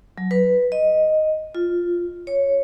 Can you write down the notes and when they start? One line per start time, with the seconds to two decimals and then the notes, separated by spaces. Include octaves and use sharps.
0.18 F#3
0.31 B4
0.72 D#5
1.55 F4
2.27 C#5